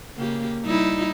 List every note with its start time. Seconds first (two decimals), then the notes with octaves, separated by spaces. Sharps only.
0.15 C#3 A#3 G4
0.65 G3 D#4 E4